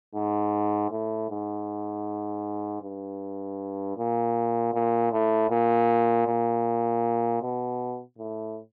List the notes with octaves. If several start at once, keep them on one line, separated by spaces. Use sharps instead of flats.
G#2
A2
G#2
G2
A#2
A#2
A2
A#2
A#2
B2
A2